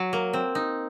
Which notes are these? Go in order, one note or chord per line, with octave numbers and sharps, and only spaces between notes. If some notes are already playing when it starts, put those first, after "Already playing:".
Already playing: F#3
A#3
C4
D#4